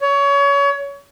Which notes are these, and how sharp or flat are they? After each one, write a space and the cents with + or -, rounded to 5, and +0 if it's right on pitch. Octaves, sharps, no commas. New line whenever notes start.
C#5 +25